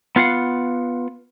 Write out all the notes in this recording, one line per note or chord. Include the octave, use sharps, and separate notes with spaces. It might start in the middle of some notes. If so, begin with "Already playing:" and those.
B3 F4 F5 F#5